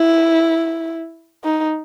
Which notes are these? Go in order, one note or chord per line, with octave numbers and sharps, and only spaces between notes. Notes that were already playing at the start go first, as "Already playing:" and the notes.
Already playing: E4
D#4